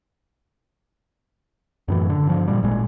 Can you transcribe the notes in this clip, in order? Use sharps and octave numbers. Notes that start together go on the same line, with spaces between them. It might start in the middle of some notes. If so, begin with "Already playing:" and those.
F#2 A2 E3
D3
G2 F3
A#2 G3
G#1 A#2 G#3